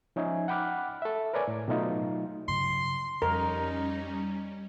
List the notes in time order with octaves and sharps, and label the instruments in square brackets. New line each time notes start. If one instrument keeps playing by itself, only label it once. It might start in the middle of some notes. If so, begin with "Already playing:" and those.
[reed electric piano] F3 C#4 D#4 E5 G#5
F#5 G5 B5 D6 F6 F#6
A4 E5
A#4 B4 C#5 D5 G#5
A2
B2 F#3 A3 D#4 F4
[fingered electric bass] G2 C#3 F#3 [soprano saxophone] C6
[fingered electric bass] F2 [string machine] G3 C#4 [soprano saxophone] D#4 [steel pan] A#4